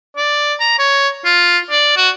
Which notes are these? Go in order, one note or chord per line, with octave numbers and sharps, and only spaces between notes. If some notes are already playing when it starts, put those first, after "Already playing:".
D5
A#5
C#5
F4
D5
F#4